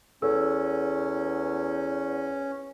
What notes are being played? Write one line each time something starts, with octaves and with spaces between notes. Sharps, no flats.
E2 C#4 A4 E6